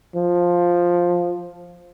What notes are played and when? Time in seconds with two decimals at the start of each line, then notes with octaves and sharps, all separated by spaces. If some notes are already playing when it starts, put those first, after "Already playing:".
0.16 F3